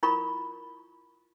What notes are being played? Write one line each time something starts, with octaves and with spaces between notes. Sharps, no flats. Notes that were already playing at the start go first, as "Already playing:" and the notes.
E4 F4 A#4 B5 C#6